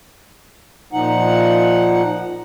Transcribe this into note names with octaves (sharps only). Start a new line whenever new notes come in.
A#2 F3 D#4 F#5